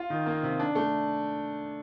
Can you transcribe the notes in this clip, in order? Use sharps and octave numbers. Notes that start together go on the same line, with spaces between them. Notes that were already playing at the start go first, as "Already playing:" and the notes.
Already playing: F4
D#3
A#3
C3
D4
A3